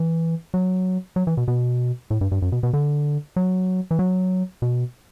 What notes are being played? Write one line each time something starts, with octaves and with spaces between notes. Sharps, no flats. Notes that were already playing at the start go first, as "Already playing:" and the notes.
Already playing: E3
F#3
F#3
E3
B2
B2
A2
G2
G2
F#2
B2
B2
D3
F#3
E3
F#3
B2